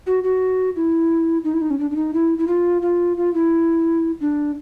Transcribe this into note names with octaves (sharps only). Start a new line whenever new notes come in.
F#4
F#4
E4
D#4
E4
D#4
C#4
D4
D4
D#4
E4
E4
F4
F4
F4
E4
D4